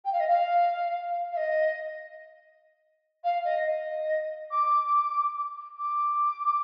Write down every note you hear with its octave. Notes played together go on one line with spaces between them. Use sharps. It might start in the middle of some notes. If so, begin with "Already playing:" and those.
G5
F5
D#5
F5
F5
D#5
F5
D#5
D#5
D6
D6